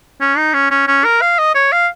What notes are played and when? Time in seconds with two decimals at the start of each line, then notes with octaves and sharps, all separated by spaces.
0.21 C#4
0.37 D#4
0.54 C#4
0.71 C#4
0.87 C#4
1.05 A#4
1.21 F5
1.38 D#5
1.55 C#5
1.72 F5